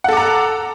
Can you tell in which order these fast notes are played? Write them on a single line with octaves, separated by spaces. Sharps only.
F#5 A4 D6 A#5